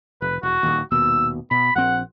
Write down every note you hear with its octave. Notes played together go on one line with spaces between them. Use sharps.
F1 B4
E1 F#4
D#1 D#2
D#1 D#2 B2 E6
B2 B5
A#1 C4 F#5